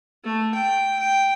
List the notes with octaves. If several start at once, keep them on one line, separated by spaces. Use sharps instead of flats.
A3
G5
G5